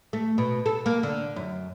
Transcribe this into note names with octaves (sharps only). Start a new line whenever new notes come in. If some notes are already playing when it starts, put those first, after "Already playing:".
A3
B2
A4
A#3
D3
F#2